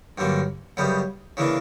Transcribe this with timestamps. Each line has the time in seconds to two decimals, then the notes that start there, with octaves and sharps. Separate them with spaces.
0.18 G2 D3 F#3 A#3
0.77 F#2 C#3 G3 B3
1.37 C#3 E3 A#3 D4